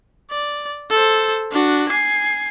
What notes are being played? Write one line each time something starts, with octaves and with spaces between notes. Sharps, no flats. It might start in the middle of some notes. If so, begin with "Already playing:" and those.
D5
A4 C5
D4 F#4
G#5 C7